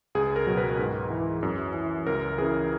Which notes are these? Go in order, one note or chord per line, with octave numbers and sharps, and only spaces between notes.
C#2 G#4
A#4
B2 F#3
B4
G#2
E3
F#2
E3
C#2 A#4
C#3 E3 G#4